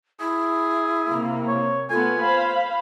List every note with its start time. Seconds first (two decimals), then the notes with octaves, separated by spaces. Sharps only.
0.20 E4 G#4
1.08 C3 A#3
1.48 C#5
1.90 A3 B3 F4 G#5
2.19 C5 F5 B5